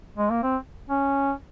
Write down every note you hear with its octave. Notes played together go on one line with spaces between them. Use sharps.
G#3
A#3
C4
C#4